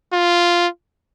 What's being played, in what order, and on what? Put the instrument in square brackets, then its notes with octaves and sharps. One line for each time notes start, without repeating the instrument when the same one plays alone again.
[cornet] F4